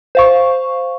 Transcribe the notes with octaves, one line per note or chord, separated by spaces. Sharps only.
C5 F5 C#6